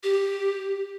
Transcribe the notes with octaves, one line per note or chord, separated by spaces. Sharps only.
G4